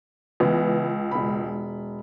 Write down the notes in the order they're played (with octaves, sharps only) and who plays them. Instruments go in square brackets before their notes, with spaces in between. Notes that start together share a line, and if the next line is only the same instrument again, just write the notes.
[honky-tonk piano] C#2 [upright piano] E3 B3
[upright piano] E1 B5